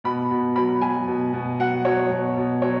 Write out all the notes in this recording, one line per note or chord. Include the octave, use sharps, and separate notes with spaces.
B2 B5
B2
F#3 B5
F#3 G#5
B2
B2
F#3 F#5
F#3 C#5
B2
B2
F#3 C#5